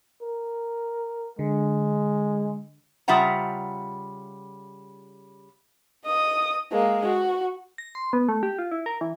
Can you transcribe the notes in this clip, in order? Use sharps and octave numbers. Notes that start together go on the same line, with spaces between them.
A#4
D3 G#3
C#3 G3 F4 E5 F#5 A#5
D#5 D#6
G#3 A#3
F#4
A#6
C6
B3
A3
G4
F4
E4
A#4
E3